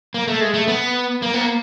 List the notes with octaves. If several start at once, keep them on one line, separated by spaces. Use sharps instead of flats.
A#3
A3
G#3
A3
B3
A#3
B3
A#3